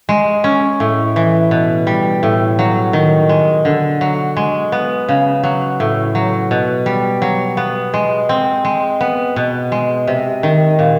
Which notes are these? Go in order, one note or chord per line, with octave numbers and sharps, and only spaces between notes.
G#3
C#4
A2
E3
B2
G3
A2
F#3
D#3
G#3
D3
F#3
G#3
B3
C#3
F#3
A2
F#3
B2
G3
F#3
B3
G#3
C4
G#3
B3
B2
G#3
C3
D#3
A#2